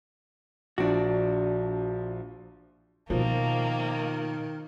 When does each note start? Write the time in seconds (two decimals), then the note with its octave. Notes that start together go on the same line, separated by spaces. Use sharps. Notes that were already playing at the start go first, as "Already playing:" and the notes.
0.78 A#1 F3 D4 F#4
3.10 B2 D#3 F3 A#3